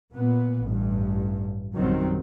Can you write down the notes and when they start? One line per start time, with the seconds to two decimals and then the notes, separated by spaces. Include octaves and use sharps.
0.13 A#2 B3
0.67 A1 G2
1.74 A#1 F#2 D#3 F#3 G3 C4